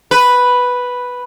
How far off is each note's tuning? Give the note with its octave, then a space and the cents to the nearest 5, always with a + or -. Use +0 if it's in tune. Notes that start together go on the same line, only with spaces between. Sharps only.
B4 +0